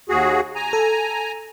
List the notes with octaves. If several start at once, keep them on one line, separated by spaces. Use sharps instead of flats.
D#2 F#4 G#4
G#5 A#5
A4